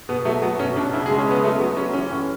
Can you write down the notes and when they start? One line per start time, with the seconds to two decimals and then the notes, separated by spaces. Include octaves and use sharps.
0.09 B2 B3
0.25 F#3 A3
0.42 F#3 B3
0.59 B2 C#4
0.76 B2 D4
0.93 C#3 E4
1.06 G#4
1.10 G#3
1.18 C#4
1.27 C#3 B3
1.43 F#3 A3
1.60 F#3 B3
1.77 F#3 C#4
1.93 E3 C#4
2.11 A2